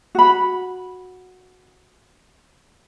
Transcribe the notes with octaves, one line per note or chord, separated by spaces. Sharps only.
F#4 B5